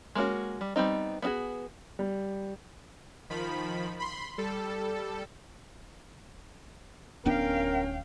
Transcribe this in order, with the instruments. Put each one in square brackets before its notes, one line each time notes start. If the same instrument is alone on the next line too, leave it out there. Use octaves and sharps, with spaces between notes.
[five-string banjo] G#3 A#3 C#4 F#4
G3
G3 B3 C4 D#4
B3 D4 F4 F#4 G#4
[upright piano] G3
[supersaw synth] D#3 F3 B5
B5 C6
G3 A4
[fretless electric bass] D1 B3 D4 [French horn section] C#4 [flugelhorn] A#4 [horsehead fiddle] F5 G5